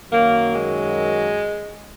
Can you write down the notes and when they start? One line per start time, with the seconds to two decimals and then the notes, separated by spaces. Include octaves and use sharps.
0.10 F#2 D#3 F#3 A#3
0.53 G#3